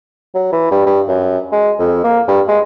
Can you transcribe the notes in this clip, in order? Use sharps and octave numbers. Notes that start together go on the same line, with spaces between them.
F#3
E3
G2
G2
F#2
G#3
F2
A#3
G2
G#3